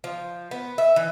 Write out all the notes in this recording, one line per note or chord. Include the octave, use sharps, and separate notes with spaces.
F3
B3
E5
E3